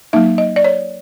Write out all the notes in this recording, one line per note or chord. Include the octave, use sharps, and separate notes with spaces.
F#3 A#3 D#4 E5
D#5
D5
C#5